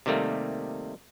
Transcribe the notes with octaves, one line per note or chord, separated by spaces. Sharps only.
C3 D#3 G3 A3 A#3